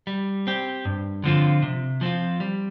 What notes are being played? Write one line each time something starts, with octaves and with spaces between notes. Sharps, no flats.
G3
C4 G4
G2
D3 F3 C4 F4
C3
F3 C4 F4
G3